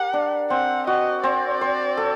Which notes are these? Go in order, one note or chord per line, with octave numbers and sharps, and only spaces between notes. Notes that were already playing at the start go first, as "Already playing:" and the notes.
Already playing: G4 A#4 F#5
D4
C4 F#5
F#4 D#5
C4 D5
C5
A4